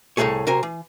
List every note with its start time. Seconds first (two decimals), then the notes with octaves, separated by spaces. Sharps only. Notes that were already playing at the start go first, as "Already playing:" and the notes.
0.17 C2 A2 G#3 A3 G#4 C#5
0.47 C3 F#3 A#4 C5 G#5
0.63 E3